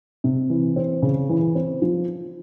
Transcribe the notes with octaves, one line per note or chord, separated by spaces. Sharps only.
C3
E3
C4
C#3
E3
C4
F3